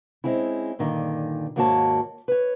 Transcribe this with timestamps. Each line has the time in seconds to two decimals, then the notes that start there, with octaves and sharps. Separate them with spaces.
0.24 G#3 C4 C#4 E4
0.79 G2 A#2 D3 D#3
1.56 D#2 G#2 A#3 F#4 C#5 A5
2.28 B4 C#5